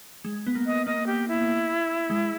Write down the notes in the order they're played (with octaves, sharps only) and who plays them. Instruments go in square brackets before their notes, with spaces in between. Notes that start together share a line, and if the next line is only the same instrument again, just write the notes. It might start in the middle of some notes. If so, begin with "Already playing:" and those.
[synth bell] G#3
B3
A#3
[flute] D#5
[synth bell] A#3 [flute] D#5
[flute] G4
E4
[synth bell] G#3